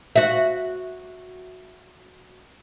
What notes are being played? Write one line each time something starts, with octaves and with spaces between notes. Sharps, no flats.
F#4 E5